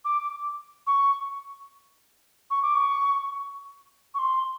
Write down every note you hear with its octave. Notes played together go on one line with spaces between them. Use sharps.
D6
C#6
C#6
D6
C#6
C#6
C6